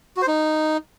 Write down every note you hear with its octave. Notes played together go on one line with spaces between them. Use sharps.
F#4
C5
D#4